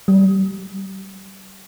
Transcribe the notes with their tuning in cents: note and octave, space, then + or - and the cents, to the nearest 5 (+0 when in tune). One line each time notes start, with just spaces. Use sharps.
G3 -30